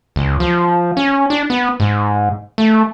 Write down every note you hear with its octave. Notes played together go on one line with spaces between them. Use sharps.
C#2
F3
C#4
D4
B3
G#2
A3